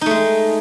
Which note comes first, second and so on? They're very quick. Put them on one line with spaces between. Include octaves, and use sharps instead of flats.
D#4 A3 G#3